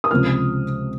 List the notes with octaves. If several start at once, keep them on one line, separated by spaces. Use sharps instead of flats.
D#6
C#2 C3 F3 F6